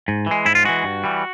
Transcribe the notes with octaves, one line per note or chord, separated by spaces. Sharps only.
G#2
E3 G#3
G#2 E4
F4
E3 G#3 F#4
G2
E3 G3